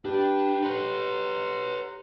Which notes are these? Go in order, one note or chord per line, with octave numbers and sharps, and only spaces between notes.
D4 G4 B4 G5
B4 C#5 F#5 A#5 C6